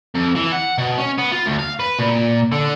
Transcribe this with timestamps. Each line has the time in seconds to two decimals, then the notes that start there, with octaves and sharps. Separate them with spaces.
0.15 F2
0.36 E3
0.52 F#5
0.78 B2
0.98 C#4
1.18 B3
1.32 F4
1.46 D2
1.59 F5
1.79 B4
1.99 A#2
2.52 D3